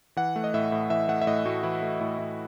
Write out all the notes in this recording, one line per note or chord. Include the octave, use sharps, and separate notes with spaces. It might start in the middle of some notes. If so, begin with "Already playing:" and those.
E3 F#5
A3
D#5
A2 E5
A2
E3 E5
A3 F#5
E5
A2 D#5
A2 F#4
E3 E4
A3
A2
A2